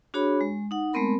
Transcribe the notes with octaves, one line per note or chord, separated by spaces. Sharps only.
D4 F#4 G#4 C#5 B5
G#3
D#4 F#5
G#3 A3 B3 C4 A#4 B5